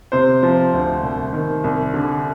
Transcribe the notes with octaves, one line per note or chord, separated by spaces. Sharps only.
C3 C5
F3
D2
C2
D#3
C2
D3